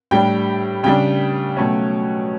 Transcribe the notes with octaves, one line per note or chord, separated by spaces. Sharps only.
A2 G3 D4 G5
C#3 G3 D4 G5
B2 F#3 A3 C#4